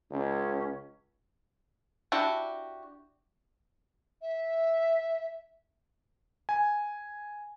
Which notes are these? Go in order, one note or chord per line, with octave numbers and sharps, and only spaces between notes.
C#2 C#4
D4 E4 F#4 G4
E5
G#5